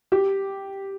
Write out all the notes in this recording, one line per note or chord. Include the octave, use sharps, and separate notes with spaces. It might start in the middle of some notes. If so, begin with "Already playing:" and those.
G4